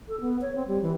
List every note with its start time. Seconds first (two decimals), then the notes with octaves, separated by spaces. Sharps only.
0.09 A4
0.20 B3
0.41 C#5
0.56 C4
0.68 G3
0.82 E3